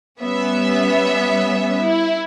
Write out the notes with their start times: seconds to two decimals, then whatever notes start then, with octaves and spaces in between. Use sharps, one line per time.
0.21 G3 B3 C#4 E5
1.83 E4